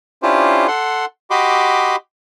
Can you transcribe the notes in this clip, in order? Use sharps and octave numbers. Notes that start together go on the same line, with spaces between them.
C#4 D4 E4 F4 G4 C5
A4 F#5 C6
F#4 G4 D#5 B5 C6 D6